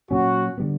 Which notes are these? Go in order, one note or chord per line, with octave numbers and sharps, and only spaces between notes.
A#2 F#3 C#4 F#4
D3 G3 B3